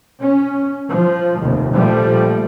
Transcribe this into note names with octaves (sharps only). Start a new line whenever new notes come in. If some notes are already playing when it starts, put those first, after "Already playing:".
C#4
F3
F1 D#2
A#1 F3 G3 A3